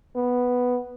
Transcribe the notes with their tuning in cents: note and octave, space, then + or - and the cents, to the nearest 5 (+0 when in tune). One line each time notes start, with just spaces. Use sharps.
B3 +0